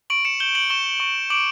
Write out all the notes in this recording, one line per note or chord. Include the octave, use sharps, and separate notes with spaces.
C#6 D7 F#7
C#7 E7
G6 E7 G7
D7 F#7
C#6 E7 G7
C#6
D6 D7 F#7